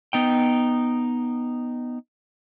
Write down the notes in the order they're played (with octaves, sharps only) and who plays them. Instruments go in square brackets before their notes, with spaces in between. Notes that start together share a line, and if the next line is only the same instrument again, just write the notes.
[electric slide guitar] B3 D#4 G5